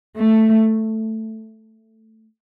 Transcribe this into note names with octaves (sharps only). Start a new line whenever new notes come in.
A3